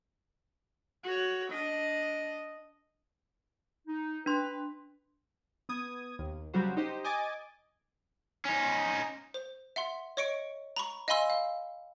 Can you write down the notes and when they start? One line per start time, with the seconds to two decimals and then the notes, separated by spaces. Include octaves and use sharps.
1.04 F#4 C#5
1.50 D4 D#5
3.88 D#4
4.26 D4 B4 C6
5.69 B3 D#6 G#6
6.19 D#2
6.54 C#3 F#3 G3 F#4 G4 C5
6.77 D#4 G4 C5 D#5
7.04 D#5 G#5 D6 A6
8.45 C#4 D#4
9.34 C5
9.76 E5 F#5 C6
10.17 C#5 D#5 C#6 C#7 D7
10.76 A#5 B5 C#6
11.08 D#5 F5 G#5 B5 C6 E6
11.30 F5